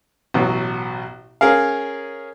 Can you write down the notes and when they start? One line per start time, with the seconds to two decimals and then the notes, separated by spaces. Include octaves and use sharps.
0.34 A1 B2 F#3
1.41 C#4 G#4 A#4 F5